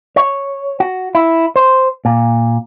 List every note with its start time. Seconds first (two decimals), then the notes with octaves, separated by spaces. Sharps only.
0.16 C#5
0.80 F#4
1.15 E4
1.56 C5
2.05 A#2